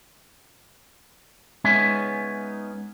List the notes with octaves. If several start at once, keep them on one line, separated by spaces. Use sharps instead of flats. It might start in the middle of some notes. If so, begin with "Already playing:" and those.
G#3 B3 C#4 D#4 E5 G#5